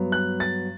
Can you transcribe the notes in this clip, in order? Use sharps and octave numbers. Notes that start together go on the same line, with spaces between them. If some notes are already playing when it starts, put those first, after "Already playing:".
Already playing: G2 F#3 B3
F#6
A6